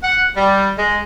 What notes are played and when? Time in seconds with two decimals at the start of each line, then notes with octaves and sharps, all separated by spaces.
0.02 F#5
0.36 G3
0.77 G#3